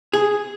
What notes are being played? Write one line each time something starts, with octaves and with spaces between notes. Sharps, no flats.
G#4